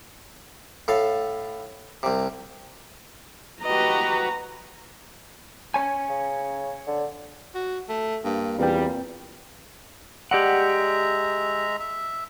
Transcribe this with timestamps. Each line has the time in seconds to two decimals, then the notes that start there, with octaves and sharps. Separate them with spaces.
0.88 A2 A4 F5
2.03 C2 C3
3.63 F#4 G4 B4 D#5 A#5
5.74 C#5 G#5
6.09 C#3
6.87 D3
7.55 F#4
7.89 A3
8.25 G2 A#3
8.59 E2 A#2 G3 C4 B4 G5
10.31 G#3 G4 D5 E5 F#5 A#5
11.80 E5